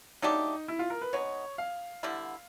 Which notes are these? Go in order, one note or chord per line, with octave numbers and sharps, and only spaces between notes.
F#3 A3 D4 D#4 G4
E4
F4
A#4
B4
G#3 B3 D#4 C#5
F5
D3 G3 B3 E4